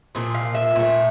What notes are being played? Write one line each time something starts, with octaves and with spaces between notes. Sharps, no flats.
A#2 F3
F5
E5
A#2 A3